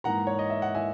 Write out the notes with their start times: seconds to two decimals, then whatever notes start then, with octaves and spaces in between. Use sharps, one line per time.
0.04 G#2 E3 A#3 F#5 A#5
0.27 C#5
0.39 D#5
0.50 E5
0.62 F#5
0.75 E3 A#3 E5 G#5